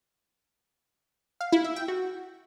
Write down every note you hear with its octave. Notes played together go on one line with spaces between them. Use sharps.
F5
E4
E5
G5
F#4